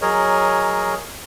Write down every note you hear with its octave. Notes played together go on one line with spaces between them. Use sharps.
F#3 G#4 A#4 C#5 D#5